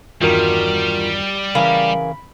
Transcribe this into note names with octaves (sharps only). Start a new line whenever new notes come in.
E2 G2 D#3 G3 F4 F#4 A#4
C#3 E3 C#4 A#4 F5 G#5 B5